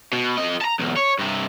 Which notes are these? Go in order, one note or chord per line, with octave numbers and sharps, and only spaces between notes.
B2
F2 D#5
A5 A#5
B1 E2
C#5
G2 C3